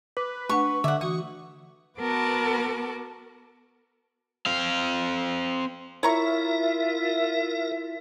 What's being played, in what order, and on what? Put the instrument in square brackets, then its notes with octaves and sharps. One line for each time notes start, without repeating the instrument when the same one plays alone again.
[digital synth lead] B4 [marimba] D6
[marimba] A3 D4 F#5 [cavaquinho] C#6
[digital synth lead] D3 [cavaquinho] E5 F#5 [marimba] D6
[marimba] E3 F#4 [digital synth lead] C#6 [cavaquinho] D#6
[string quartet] B3 F#4 A#4 B4 A5 D6
[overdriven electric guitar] C4 F5
[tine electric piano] E4 [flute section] F4 E5 [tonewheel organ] A#4 [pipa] C#5 A#5 C#6